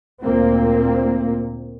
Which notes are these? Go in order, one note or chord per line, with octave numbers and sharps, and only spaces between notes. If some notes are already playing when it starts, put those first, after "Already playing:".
D2 A#2 A#3 C4